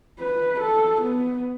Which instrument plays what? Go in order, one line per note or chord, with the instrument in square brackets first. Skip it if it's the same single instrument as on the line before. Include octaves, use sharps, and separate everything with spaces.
[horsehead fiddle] B4
A4
B3